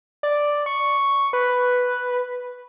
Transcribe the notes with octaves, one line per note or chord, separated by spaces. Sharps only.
D5
C#6
B4